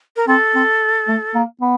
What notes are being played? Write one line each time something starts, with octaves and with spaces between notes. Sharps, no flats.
A#4
C4 A4
C4
A3
A#3
B3